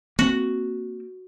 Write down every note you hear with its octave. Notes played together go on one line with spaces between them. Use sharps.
A#3 C4 F#4